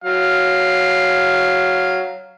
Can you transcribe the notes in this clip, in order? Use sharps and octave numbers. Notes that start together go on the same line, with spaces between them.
F#3 F5